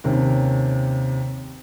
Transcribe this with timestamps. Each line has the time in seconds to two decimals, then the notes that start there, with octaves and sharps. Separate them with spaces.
0.04 D#2 C3 C#4